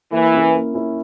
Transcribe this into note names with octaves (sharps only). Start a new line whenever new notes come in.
E3 A#3
C#4 E4 A#4
A#3
C#4 E4 A#4